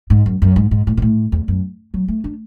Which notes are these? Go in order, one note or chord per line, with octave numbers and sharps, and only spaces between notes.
G#2
F#2
F#2
G#2
G#2
A2
B2
A2
E2
F#2
F#3
A3
D4